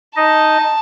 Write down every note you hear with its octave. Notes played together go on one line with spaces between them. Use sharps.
D#4 D#5 A5